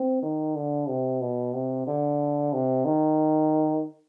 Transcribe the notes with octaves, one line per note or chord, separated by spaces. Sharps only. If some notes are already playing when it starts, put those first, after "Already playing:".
Already playing: C4
D#3
D3
C3
B2
C3
D3
C3
D#3